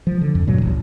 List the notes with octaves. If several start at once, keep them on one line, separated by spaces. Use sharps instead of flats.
F3
D3
F2
G2 A#2 C#3 F#3
D1 A1